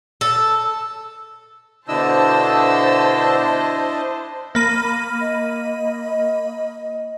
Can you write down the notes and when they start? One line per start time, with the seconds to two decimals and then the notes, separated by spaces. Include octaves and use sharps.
0.21 A4
1.88 B2 D3 D4 E4 C5 D#5 A5 E6
4.55 A#3 B5 D#7
5.21 D#5